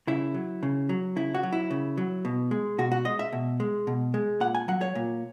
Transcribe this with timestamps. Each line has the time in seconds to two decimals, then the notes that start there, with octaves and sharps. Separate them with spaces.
0.07 C#3 E4
0.34 F#3
0.63 C#3
0.89 F#3
1.16 C#3 E4
1.35 F#4
1.43 F#3
1.53 E4
1.71 C#3
1.97 F#3
2.25 B2
2.51 G#3
2.78 B2 F#4
2.92 F#4
3.05 G#3 D#5
3.19 E5
3.33 B2
3.60 G#3
3.87 B2
4.14 G#3
4.40 A#2 F#5
4.55 G#5
4.68 F#3 F#5
4.81 C#5
4.95 A#2